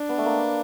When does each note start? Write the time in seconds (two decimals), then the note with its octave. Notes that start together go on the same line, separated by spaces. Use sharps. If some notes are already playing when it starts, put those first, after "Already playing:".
Already playing: D4
0.09 B3
0.18 A3
0.26 A#3